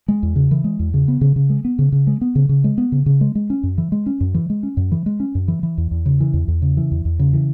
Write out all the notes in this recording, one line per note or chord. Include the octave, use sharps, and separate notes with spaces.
G#3
E2
C#3
E3
G#3
E2
C#3
B3
C#3
C#3
G#3
B3
C#3
C#3
G#3
B3
C#3
C#3
G#3
B3
C#3
C#3
G#3
G#3
C#4
F#2
E3
G#3
C#4
F#2
E3
G#3
C#4
F#2
E3
G#3
C#4
F#2
E3
E3
E2
E2
C#3
E3
E2
E2
C#3
E3
E2
E2
C#3
E3